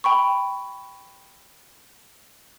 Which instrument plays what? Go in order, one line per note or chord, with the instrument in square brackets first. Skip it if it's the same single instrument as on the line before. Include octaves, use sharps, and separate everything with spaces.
[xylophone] G5 B5 C#6